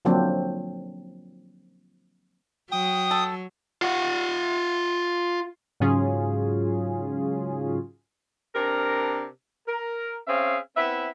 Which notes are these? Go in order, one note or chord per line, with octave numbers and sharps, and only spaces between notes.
D3 F3 F#3 A#3 C4 D4
F#3 G5 D#6
A4
F4 F#5
G#2 C#3 F#3 C#4 F4 G#4
C3 D4 A#4
A#4
C4 C#4 G#4 E5 F5
B3 C4 E4 E5